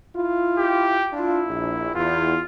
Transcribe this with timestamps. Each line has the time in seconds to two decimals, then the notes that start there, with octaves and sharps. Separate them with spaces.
0.15 E4 F4
0.58 G4
1.12 D4 E4 F4
1.47 A#1
1.95 E2 F4